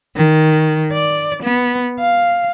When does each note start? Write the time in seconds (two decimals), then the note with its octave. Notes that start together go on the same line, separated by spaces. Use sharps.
0.16 D#3
0.93 D5
1.43 B3
2.00 F5